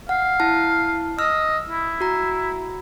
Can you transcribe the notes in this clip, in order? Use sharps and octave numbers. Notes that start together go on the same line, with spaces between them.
F5 F#5
E4 A5
D#5 E6 F6
E4
F#4 A#5